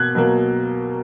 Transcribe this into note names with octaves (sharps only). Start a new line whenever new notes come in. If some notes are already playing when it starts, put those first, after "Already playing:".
Already playing: B2 A#3 F#6 G#6
B2 F#3 A#3